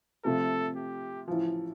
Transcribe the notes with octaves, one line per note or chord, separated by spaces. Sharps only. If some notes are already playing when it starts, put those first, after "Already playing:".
C3 F3 A3 A4
G4
A1 A2 F3